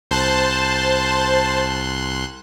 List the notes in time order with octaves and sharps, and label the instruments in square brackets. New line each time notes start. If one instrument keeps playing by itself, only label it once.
[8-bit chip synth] C2 C6 F#6 [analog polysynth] C5 A5